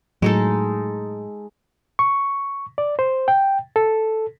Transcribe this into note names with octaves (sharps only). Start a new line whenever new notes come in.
A2 F#3 G#3 D#4 A4
C#6
D5
C5
G5
A4